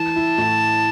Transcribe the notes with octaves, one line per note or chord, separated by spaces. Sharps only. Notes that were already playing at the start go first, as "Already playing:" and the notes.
Already playing: E3 A5
E4
A2